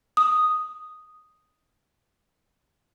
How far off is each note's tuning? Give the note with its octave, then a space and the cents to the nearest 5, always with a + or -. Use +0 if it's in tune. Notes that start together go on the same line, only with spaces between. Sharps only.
D#6 -5